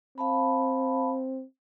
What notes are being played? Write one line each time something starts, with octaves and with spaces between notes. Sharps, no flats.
C4 F5 A5 B5